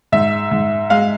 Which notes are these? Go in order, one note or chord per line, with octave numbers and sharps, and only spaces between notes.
G#2 E5
G#2
G#3 F5